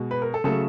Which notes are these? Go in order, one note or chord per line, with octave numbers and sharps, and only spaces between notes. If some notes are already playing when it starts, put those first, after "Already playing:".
Already playing: B2 G#3
B4
A#4
A4
C#3 F#3 A3 A4